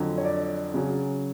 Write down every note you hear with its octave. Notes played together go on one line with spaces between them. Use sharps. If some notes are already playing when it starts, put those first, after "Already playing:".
Already playing: F2 D3 F#3
C#5
D5
C#3 F#3 C#4